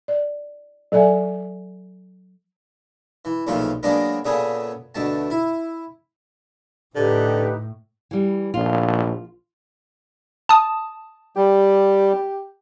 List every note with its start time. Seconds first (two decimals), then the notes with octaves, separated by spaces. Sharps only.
0.08 D5
0.92 F#3 A4 D5 E5 G#5
3.25 E3
3.47 B1 A#2 C#3 F3 A3 F4
3.83 F#3 G#3 A#3 B3 D4 A#4
4.25 A#2 C#3 A3 B3 G#4 D#6
4.95 D2 B2 A3 A5
5.30 E4
6.95 A2 D3 D#4 G4 B4
8.11 E3 G3
8.54 A#1 F4
10.49 A5 D#6
11.36 G3 G4